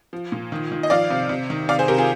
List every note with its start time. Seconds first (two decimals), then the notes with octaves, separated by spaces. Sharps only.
0.13 F3
0.32 A#2
0.52 D#3
0.72 D#3
0.83 D#5
0.90 F3 D5 F5
1.10 C3
1.29 C3
1.50 D#3
1.69 C3 D5 F5
1.79 G#4 C5
1.88 C3 G4 A#4
1.98 F4 G#4